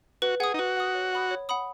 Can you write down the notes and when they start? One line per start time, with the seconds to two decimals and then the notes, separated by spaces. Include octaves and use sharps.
0.22 F#4 B4
0.40 G#4 F#5 D#6
0.54 D#4
0.59 F#4 B4
0.77 F#5 D#6
0.95 C#5
1.13 F#5 B5 D#6
1.31 C#5
1.49 F#5 B5 D#6